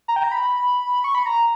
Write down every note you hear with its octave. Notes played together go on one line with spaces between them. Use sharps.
A#5
G5
A#5
B5
C#6
B5
A#5